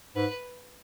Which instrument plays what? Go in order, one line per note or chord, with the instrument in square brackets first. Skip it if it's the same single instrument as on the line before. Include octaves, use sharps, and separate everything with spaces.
[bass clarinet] G#2 [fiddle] B4